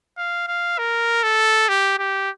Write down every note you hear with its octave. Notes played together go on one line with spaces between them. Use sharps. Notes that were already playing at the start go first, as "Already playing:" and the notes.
F5
F5
A#4
A4
G4
G4